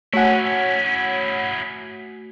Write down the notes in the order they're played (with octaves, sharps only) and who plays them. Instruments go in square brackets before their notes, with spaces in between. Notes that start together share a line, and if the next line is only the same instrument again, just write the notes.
[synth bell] A3 F#4 G#5 [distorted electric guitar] C#4 E4 [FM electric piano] C#5 F#5